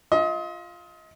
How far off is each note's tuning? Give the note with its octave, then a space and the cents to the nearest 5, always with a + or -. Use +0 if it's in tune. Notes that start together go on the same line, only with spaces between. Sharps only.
F4 +0 D#5 +35